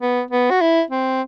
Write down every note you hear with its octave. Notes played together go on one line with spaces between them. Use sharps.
B3
B3
F#4
E4
C4